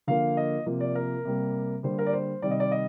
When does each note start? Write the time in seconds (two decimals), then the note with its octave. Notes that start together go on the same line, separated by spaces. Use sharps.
0.07 D3 F3 A#3 F5
0.37 D#5
0.66 C3 F3 A#3
0.81 D5
0.95 A#4
1.25 C3 G3 A#3
1.83 D3 G3 A#3 C5
1.99 A#4
2.06 D5
2.13 C5
2.42 C3 D#3 G3 D5
2.51 D#5
2.60 D5
2.72 D#5